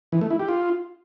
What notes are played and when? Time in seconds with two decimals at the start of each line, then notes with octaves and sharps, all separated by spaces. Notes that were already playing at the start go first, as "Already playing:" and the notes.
0.12 E3
0.21 A3
0.30 E4
0.40 G4
0.49 F4